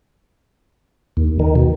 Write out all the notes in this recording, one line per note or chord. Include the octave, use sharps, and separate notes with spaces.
D#2
D#3
B2